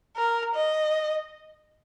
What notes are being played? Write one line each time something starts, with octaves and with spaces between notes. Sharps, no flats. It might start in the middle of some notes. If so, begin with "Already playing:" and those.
A#4
D#5